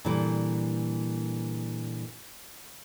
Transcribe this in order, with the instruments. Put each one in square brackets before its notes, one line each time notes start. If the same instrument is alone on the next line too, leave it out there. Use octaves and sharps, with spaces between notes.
[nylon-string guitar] A#2 D3 E3 G3